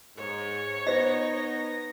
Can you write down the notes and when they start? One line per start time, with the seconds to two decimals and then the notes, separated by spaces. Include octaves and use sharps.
0.17 G#2 C#5
0.87 B3 D#4 C5 D#5 A#6